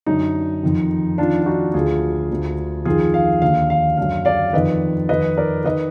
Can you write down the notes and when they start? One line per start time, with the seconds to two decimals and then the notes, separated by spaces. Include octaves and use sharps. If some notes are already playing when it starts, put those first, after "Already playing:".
0.06 F#2 D3 D#4
0.63 F2 D#3
1.18 F2 D#3 D4 F4
1.42 F4
1.46 D#4 F#4
1.74 D2 D3 F4 G#4
2.30 D2 D3
2.85 F2 D#3 F4 G#4
3.14 F5
3.42 D#2 D3 F5
3.70 F5
3.97 F#2 D3 F5
4.25 D5 F5
4.53 F2 D#3 B4 D#5
5.09 F2 D#3 B4 D#5
5.37 A#4 D5
5.64 D#3 B4 D#5